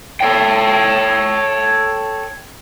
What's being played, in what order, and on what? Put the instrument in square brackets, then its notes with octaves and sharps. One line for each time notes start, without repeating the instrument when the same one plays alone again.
[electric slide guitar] A4 C#5 G5